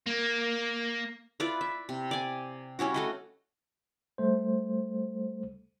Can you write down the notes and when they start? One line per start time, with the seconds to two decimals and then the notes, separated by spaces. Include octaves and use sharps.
0.06 A#3
1.40 E4 F4 B4 D5
1.61 E5
1.89 C3
2.11 D5 G#5
2.79 G3 C#4 E4 F#4
2.94 A3 F#4 D#5
4.18 G3 A3 C5